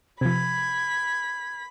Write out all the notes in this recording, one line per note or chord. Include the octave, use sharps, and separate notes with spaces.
C3 F3 B5 G#6 B6